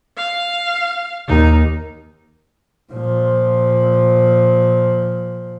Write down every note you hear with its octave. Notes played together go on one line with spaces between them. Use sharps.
F5
D#2 D#4
A#2 F3